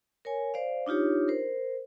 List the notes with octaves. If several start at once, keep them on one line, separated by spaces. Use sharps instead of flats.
A#4 C#5 G#5
C5 D5 F5
D4 D#4 F4 G4 C#5
A#4 C5